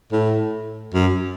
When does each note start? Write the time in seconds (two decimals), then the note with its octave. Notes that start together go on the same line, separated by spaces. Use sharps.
0.12 A2
0.94 F#2